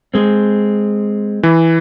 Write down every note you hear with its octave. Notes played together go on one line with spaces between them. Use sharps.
G#3 C4
E3